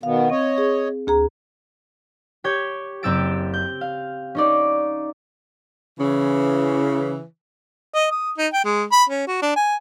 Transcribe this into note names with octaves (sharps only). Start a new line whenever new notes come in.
B2 D#3 B3 F5
C4 C#5 D#5
G#4
D2 G#4 A#5
G4 C#5 G6 G#6
F#1 C4 G4 E6 A6 D7
G6
F5
C#4 D#4 D5
C#3 E3
D#5
D#6
D#4
G5
G#3
B5
C#4
F#4
D4
G#5